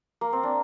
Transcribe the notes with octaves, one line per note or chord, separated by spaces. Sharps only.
A#3
C4
D4